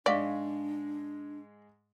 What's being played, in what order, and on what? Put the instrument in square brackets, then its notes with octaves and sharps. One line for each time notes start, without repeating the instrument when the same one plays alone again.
[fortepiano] G#2 G#3 [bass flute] D4 [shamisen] D5 [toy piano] E5 F5 C#6